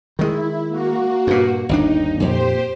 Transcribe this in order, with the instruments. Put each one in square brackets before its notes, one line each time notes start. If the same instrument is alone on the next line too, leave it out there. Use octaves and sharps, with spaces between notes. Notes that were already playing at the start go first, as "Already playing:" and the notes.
[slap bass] D#3 G#3 [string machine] E4
[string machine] A#3 F#4
[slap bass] G2 A#2
[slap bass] G1 D#2 D4 [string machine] D#4
[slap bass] F2 A#2 [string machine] G4 C5